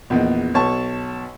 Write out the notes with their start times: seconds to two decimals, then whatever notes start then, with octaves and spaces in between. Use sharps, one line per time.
0.10 A#1 E2 D#5
0.54 B1 C#5 A5 C#6